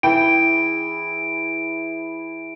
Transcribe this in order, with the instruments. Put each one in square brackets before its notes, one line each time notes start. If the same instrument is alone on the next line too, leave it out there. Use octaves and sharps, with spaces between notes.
[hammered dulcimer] E3 E4 G#4 [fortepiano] G5 [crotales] D7